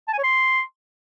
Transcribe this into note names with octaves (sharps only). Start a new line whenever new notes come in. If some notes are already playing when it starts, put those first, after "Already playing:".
A5
G#5
C#5
C6